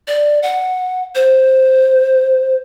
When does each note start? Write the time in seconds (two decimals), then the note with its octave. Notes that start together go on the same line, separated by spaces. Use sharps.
0.07 D5
0.43 F#5
1.15 C5